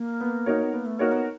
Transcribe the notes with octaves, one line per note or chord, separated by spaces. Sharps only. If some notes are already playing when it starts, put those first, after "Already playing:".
Already playing: A#3
B3
D#4 F#4 A#4 C#5
B3
A#3 B3
A3
A#3 D#4 F#4 A#4 C#5
B3